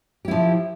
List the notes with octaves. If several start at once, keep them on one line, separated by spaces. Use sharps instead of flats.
F3 E4 G4